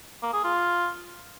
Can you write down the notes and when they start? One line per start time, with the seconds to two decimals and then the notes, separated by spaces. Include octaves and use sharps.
0.22 A#3
0.33 G#4
0.44 F4